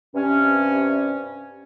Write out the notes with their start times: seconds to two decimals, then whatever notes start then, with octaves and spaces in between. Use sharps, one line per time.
0.15 G2 C3 C#4